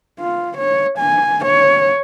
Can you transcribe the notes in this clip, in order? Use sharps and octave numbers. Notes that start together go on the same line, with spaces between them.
F4
C#5
G#5
C#5